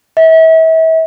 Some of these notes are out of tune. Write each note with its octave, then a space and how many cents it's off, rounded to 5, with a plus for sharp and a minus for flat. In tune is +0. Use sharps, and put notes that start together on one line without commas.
E5 -35